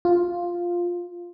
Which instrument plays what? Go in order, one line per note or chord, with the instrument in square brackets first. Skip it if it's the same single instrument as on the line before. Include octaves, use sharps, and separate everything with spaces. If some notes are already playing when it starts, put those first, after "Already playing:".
[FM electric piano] F4